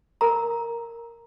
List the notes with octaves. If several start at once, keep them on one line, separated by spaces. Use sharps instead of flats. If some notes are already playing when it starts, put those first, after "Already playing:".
A#4 A#5